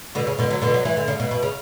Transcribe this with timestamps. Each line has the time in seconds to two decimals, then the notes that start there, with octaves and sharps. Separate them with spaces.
0.15 B2 D3
0.27 C#3
0.39 B2 D3
0.50 D3 F#3
0.62 B2 D3
0.74 F#3
0.85 E3
0.97 D3
1.08 C#3
1.20 B2
1.31 B2
1.43 C#3